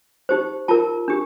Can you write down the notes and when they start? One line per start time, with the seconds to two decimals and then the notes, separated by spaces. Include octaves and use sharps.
0.29 D#4 G4 C5
0.68 F4 A#4 A5
1.08 D4 G4